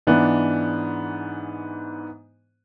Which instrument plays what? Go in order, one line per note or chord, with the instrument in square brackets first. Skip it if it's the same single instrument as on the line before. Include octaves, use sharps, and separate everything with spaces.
[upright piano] G#2 E3 B3 D4